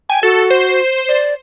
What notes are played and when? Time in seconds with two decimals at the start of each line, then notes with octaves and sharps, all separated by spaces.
0.10 G5 G#5
0.23 F#4 A4
0.50 C5
1.09 D5